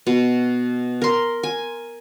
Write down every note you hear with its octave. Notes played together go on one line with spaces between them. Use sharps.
B2
A#4 C6
G#5